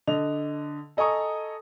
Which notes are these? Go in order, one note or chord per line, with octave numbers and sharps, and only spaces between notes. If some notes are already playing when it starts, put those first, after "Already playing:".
D3 D#5 F7
A4 D#5 G#5 A#5 C#6 D#6